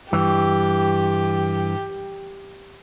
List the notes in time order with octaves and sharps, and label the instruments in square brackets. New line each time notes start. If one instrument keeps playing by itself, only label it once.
[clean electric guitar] G2 E3 [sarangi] G4